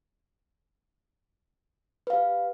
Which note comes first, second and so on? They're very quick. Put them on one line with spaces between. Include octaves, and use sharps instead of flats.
B4 F5 G4